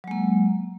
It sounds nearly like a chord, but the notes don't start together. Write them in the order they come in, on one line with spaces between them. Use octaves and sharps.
F#3 G#3 A#3